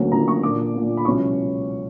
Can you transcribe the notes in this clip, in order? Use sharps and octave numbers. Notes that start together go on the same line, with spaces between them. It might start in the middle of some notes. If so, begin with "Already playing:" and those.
Already playing: D2 D3 F#3 A#3 C#4
D2 D3 F#3 A#3 C#4 A#5
C#6
A#2 A#3 D4 D6
A#2 A#3 D4
B5
C#2 B2 F#3 C#4 E4 C#6